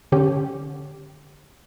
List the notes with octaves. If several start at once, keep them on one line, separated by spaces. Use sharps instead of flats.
D3 C#4 G4